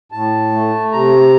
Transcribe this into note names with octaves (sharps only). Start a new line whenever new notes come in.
A2 A5
A3
C3 A#5